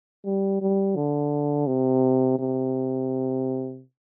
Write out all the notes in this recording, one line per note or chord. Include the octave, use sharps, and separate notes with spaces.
G3
G3
D3
C3
C3